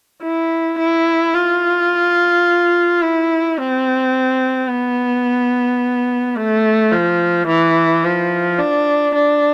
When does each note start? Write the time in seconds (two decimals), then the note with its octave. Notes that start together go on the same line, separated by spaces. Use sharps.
0.23 E4
0.79 E4
1.35 F4
3.02 E4
3.57 C4
4.69 B3
6.36 A3
6.92 F3
7.48 E3
8.04 F3
8.59 D4
9.15 D4